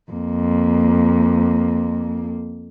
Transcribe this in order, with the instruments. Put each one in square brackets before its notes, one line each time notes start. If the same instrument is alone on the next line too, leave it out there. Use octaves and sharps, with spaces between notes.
[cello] F2 A#3